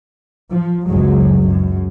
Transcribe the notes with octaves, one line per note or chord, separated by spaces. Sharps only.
F3
F#1 C#2 F#2 F#3 G#3
F#2